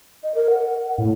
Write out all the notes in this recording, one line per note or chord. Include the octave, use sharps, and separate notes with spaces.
D#5
A#4
F#5
A2